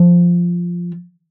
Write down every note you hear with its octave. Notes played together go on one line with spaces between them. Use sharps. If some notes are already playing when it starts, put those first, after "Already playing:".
Already playing: F3